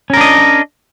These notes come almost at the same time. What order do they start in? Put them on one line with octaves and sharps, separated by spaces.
C#4 A#4 D4 D#5